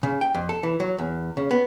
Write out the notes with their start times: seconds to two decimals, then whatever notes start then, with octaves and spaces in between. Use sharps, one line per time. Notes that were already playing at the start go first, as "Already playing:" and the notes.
0.03 C#3
0.21 G5
0.34 F2
0.49 A4
0.63 E3
0.80 F#3
0.98 E2
1.37 C#3
1.51 B3